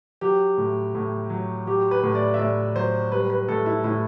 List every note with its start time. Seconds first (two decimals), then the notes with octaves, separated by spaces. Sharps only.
0.21 F#3 G4
0.58 A2
0.95 A2
1.30 F#3
1.66 F#3 G4
1.91 B4
2.03 A2
2.15 D5
2.34 E5
2.39 A2 D5
2.75 F#3 C5
3.12 G3 B4
3.30 B4
3.48 A2 A4
3.66 E4
3.84 A2 E4